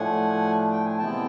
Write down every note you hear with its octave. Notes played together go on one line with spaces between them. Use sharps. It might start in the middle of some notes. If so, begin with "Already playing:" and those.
Already playing: A2 F3 A3 D4 F#5 G#5
G5
G#5
C3 E3 G#3 B3 E4 G5 A5